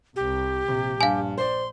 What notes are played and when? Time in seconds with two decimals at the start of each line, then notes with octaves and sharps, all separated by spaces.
0.16 C2 G4
0.68 A#1 C3
1.01 G2 F5 G#5
1.38 C5 D5 C6